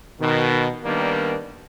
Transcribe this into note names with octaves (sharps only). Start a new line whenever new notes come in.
B2 D#3
D#3 G3 A#3 B3 D4